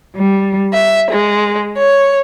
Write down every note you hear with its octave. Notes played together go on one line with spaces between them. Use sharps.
G3
E5
G#3
C#5